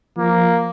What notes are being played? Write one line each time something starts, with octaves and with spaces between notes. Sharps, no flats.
F3 A#3